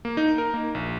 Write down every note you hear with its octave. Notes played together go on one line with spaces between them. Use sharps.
A#3
D#4
A#4
A#3
A#1